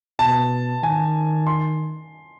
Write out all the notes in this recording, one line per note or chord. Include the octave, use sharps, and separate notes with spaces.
B2 A5
D#3 G#5
C6